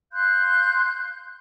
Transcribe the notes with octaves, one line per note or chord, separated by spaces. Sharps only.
F5 C6 F#6 G6